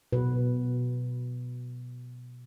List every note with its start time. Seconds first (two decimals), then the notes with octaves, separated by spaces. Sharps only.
0.13 B2 B4